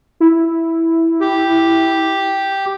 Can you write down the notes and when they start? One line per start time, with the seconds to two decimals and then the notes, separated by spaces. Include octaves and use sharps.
0.20 E4
1.21 G4